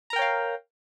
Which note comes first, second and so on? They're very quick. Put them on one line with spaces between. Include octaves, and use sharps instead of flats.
A#5 A#4 G5 C#5 F5